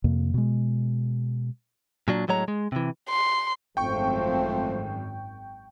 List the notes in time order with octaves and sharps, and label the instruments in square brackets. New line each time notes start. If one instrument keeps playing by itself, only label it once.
[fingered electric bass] F2 C3 A#3
B2 G#3
[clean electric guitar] A#2 F#3 D4
A2 F#3 G#3 C#5 A#5
G#3
C3 E3
[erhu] C6
[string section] G#1 F#2 [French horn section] F3 A3 C4 [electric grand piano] G5 C#6